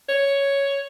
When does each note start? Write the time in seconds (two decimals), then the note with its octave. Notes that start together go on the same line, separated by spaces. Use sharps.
0.09 C#5